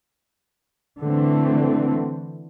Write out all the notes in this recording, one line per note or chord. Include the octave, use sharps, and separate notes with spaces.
D3 E3 A3 C4